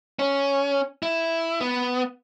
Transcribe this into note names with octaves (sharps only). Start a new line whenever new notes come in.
C#4
E4
B3